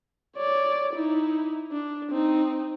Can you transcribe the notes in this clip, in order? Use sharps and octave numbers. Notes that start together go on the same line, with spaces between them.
C#5 D5
D#4 E4
D4
C4 D#4